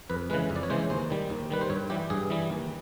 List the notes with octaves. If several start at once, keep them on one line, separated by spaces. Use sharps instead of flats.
F2 B4
C#3 E3 G#3 B4
F2
D5
C#5
C#3 E3 G#3 C5
D#2 C5
D#3 G3
D#2
D#3 G3 B4
C5
G2 C#5
E3 G3 G4
G2 G#4
E3 G3
D#2